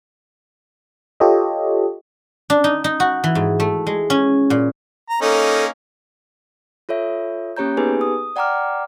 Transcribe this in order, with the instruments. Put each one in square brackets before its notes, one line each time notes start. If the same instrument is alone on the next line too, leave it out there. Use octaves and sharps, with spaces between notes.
[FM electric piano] F4 G4 A4 C#5 D#5
[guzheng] D4
D#4
D#4
F#4
E3
G#2
A3
G#3
C#4
A#2
[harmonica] A#5
[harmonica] A#3 C#4 D#4 [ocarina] A4
[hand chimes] F4 A4 C#5 E5
A#3 C#4 G4 C#5 A#5 G6
B3 D#4 G4 G#4 B4 G#5
D#6
D5 F#5 G5 A#5 D6 F6